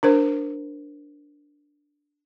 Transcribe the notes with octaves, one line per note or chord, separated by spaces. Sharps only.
D4 A#4 C5